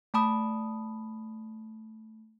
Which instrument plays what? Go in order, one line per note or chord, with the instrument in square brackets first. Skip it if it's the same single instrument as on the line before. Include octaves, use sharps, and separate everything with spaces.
[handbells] A3 A5 B5 D#6